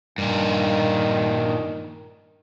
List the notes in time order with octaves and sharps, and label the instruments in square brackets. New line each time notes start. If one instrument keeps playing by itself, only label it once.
[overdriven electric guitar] G2 A#2 [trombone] D#3